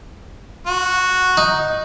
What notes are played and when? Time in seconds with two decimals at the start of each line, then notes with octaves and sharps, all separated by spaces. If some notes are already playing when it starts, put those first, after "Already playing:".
0.67 F#4
1.37 D#4